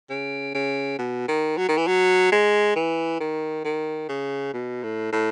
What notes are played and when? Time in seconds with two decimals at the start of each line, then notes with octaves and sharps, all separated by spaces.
0.10 C#3
0.54 C#3
0.99 B2
1.28 D#3
1.58 F#3
1.68 D#3
1.77 E3
1.87 F#3
2.32 G#3
2.76 E3
3.20 D#3
3.65 D#3
4.09 C#3
4.53 B2
4.83 A2
5.12 A2